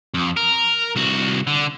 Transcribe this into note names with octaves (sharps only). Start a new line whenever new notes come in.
F2
A#4
C2 F#4
D3